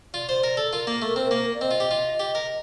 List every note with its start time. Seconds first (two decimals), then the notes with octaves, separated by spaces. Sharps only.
0.14 F4 D5
0.29 C5
0.44 A#4
0.57 A4
0.73 F4 A#4
0.87 A#3
1.02 A3
1.16 C4
1.31 A#3
1.54 D5
1.60 C4 D#5
1.71 F4
1.80 G4
1.91 F4
2.20 G4
2.35 A#4